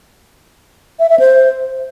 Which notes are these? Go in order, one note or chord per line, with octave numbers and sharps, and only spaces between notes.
E5
E5
C5